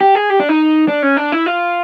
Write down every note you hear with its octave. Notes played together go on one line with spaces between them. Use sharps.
G4
G#4
G4
D4
D#4
D4
C#4
D4
E4
F4